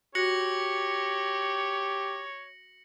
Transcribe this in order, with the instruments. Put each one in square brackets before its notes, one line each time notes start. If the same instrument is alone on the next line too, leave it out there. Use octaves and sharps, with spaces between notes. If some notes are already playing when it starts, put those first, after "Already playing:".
[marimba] F#4 [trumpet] G4 [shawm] C#5 [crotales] A#6 C#7 F#7